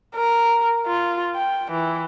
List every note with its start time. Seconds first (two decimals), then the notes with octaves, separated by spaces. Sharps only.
0.16 A#4
0.87 F4
1.35 G5
1.72 E3